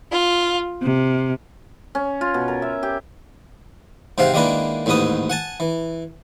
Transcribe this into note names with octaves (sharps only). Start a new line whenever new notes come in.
F4
C3
C#4
F4
B2
A#4
E5
G4
G#2 C3 C4 F5 F#5
D#3 G#3 A#3 D4 E4 B4
A1 D#2 G#2 D#4 B4 D#6
F#5 G#5 A5
E3